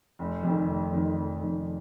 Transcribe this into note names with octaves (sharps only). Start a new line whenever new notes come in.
F1
F2 D#3
F1
F2 D#3
F1
F2 D#3